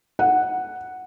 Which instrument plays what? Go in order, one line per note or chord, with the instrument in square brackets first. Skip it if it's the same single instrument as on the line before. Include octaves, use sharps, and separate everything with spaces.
[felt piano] F#5